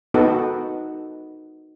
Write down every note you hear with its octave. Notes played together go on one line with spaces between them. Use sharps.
B3 D#4 F#4 A4